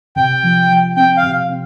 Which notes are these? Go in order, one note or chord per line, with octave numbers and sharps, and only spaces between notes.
C3 G5
F3
F3
C4 G5
F5
C3
C4